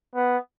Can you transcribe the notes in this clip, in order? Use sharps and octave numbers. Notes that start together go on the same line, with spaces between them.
B3